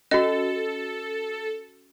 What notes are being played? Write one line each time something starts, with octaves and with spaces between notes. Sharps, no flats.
C#4 F#4 A4 D#5